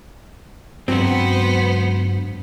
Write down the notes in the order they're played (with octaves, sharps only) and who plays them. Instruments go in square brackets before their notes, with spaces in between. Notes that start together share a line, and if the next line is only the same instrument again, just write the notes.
[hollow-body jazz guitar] C#2 F#3 C4 [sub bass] G2 [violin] B3 C5